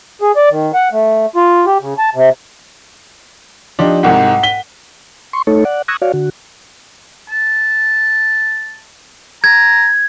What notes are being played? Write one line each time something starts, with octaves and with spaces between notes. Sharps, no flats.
G#4
D5
D#3
F#5
A3
F4
G4
C#3
A5
C3
F3 D4 D#4 G4
C2 G#2 F#5 G5
B6 D#7 G7
C6 C#6
A3 D#4 A4 C#5
D5 F#5
C#6 D#6 E6 F#6 G#6 A#6
F#4 C#5 D5 F5
D3 F#4
A5
A#5 G#6